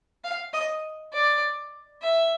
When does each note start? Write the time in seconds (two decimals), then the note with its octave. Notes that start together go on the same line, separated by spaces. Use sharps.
0.24 F5
0.53 D#5
1.13 D5
2.03 E5